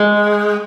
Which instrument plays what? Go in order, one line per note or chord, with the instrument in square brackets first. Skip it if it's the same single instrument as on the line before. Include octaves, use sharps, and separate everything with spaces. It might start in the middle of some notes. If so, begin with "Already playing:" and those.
Already playing: [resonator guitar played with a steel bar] G#3